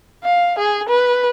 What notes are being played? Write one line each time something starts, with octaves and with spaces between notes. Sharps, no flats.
F5
G#4
B4